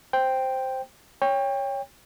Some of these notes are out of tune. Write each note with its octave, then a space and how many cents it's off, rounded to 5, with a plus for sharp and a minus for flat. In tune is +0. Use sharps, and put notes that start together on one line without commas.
C5 +0 G5 +0
C#5 +0 G5 +25